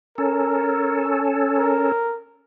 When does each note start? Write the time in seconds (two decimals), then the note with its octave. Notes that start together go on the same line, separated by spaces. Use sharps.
0.18 C#4 A4 A#4
1.58 A#4